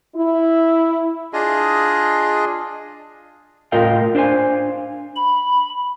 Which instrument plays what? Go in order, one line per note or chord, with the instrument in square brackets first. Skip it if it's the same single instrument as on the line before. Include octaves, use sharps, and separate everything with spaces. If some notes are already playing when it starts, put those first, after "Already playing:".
[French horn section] E4
[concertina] D4 F4 G#4 D#5
[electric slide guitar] A2 F4 A#4 D#5 F5 G5
D4 C5 F5 G#5
[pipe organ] B5